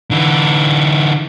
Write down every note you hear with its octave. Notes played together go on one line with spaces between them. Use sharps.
D3 E3